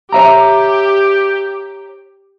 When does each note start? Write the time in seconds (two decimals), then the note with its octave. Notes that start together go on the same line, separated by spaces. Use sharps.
0.12 G4 C#5 E5 A#5